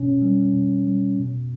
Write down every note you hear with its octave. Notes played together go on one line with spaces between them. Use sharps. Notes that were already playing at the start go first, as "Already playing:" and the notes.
Already playing: B2 C#4
G3
B2
G3
B2